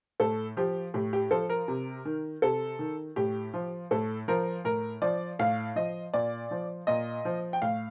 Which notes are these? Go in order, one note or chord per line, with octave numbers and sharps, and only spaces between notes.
A2 A4
F3 G4
A2 G4
G4
F3 A4
A#4
C3
D#3
C3 A4
D#3
A2 G4
F3
A2 A4
F3 A#4
A2 A#4
F3 D5
A2 F5
F3 D#5
A#2 D5
F3
A#2 D#5
F3
G5
A2 F5